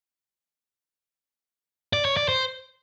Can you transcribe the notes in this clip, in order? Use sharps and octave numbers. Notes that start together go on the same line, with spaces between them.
D5
C#5
D5
C5